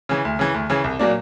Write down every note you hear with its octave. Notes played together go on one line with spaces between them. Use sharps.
C#3 E3
D2
C#3 E3
D2
C#3 E3
C2
A#2 F#3 A#3 D4